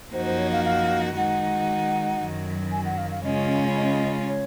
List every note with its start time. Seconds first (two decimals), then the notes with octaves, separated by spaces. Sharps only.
0.13 F#2 F3 A#3 D#4 F#4 C5
0.26 C5
0.38 C#5
0.52 F5
0.65 F5
1.15 D#3 G#3 D#4 F#4 F#5
2.19 F#2 D#3 F#3
2.72 G#5
2.85 F#5
2.98 F5
3.11 F5
3.24 C#3 G#3 C#4 F4 D#5
3.76 D#5
4.28 C#5